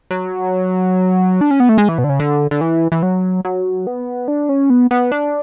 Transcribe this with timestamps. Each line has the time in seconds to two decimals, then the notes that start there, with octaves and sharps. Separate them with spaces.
0.11 F#3
1.41 D4
1.51 C#4
1.60 B3
1.69 A3
1.78 G#3
1.89 E3
1.98 B2
2.04 D3
2.09 C#3
2.20 D3
2.51 D3
2.61 E3
2.92 E3
3.03 F#3
3.45 F#3
3.87 B3
4.28 D4
4.49 C#4
4.70 B3
4.91 B3
5.12 D4